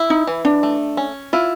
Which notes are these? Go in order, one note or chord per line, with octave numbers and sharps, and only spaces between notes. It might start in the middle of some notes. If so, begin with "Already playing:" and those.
Already playing: E4
D#4
E3
D4
A3
C#4
E4 F4